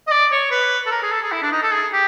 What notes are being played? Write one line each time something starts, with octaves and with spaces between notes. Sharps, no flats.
D#5
D5
C#5
B4
A4
A#4
G#4
A4
G#4
E4
D4
D#4
A4
G#4
G4